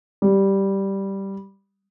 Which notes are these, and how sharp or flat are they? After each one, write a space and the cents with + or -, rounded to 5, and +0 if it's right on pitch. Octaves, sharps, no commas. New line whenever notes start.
G3 -5